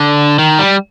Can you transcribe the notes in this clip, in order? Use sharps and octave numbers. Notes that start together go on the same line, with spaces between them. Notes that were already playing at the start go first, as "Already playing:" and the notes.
Already playing: D3
D#3
G3